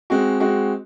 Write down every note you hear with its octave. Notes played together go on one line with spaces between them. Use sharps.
G#3 C4 F#4
G#3 C4 F#4